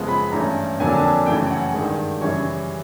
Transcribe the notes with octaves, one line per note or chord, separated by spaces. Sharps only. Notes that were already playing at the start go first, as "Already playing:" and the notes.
Already playing: F#2 C#3 F3 G#3 B3
B5
G2 E3 A3 C#4 A#5
F2 D3 F#3 A#3 D4 G#5
A5
G#5
F#2 C#3 E3 A3 C#4 G5
F#5
G2 D#3 G#3
F#2 C#3 E3 G3 C#5